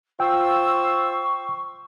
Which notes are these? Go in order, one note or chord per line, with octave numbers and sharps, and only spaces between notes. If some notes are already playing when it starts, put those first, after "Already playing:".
F4 C5 G5 C#6 E6